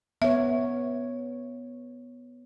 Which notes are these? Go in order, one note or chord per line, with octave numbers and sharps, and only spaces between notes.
B3 C#5 E5